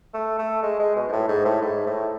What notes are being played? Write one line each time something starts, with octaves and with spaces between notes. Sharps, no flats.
A3
A3
G#3
G#3
B2
G#2
A2
G#2
A2
G#2
A2